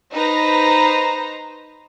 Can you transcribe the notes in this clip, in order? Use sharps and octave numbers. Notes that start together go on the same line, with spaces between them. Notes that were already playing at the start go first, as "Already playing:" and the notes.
D#4 B4 C5 A#5